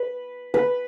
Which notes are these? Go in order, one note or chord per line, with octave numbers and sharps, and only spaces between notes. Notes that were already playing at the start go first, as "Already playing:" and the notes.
Already playing: B4
B4